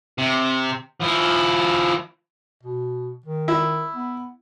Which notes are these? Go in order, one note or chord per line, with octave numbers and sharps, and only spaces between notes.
C3
F3 E4
B2
D#3
E4
B3